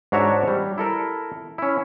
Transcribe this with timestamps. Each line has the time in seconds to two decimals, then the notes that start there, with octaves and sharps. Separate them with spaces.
0.12 G#2 D4 F#4 C#5 E5 A#5
0.48 G3
0.78 E4 A4 A#4
1.58 C#4 E4